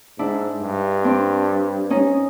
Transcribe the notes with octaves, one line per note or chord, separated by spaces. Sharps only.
G#2 D4 E4
G2
C4 D4
C#4 D#4